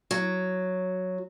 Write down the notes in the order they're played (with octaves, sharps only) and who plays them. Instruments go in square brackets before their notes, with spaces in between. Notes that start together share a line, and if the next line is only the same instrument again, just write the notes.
[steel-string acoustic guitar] F#3